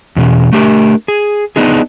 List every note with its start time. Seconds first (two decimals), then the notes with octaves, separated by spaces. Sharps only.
0.16 E2 B2 C#4
0.53 A3 D4 G4 A4 A#4
1.08 G#4
1.56 B3 D4 D#4 G#4